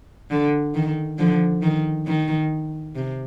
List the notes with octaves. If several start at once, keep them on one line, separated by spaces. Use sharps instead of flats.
D3
D#3
D3 F3
D#3
D#3
C3